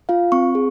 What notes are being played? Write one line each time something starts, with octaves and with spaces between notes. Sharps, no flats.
F4 F5
C4 C#6
G#4